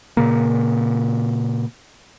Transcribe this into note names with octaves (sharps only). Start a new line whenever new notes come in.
A#2 C#3 A#3